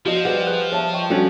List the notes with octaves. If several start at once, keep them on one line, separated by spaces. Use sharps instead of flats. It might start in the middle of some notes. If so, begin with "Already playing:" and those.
F3 F#4 D#5
G3 G#4 B4 D#5 F#5
G#4 B4 F#6
C#5 E5 A5
D#5 G5 C#6
G3 C#4 D4 F#4 A4